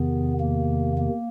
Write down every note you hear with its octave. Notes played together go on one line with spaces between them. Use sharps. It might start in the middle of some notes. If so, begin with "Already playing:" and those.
Already playing: E2 C3 D#3 B3
A#3
A#3